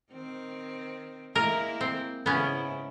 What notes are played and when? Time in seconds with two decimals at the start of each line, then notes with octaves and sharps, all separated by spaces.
0.13 D#3 C4
1.35 G#3 A#3 E4 A#4
1.81 C4
2.26 G#2 C#3 B3 C#4 E4